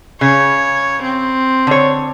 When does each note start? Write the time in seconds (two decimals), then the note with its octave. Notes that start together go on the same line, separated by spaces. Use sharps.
0.21 C#3 C#5
1.02 C4
1.67 D3 C#5